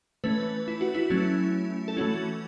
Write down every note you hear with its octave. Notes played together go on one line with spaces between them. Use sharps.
E3 A3 C#4 B4
E4
F#4
E4
F#3 A3 C#4
A4
E3 A3 C#4 F#4